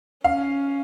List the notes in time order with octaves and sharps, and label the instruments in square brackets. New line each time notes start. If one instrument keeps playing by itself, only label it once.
[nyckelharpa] C#4 [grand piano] F5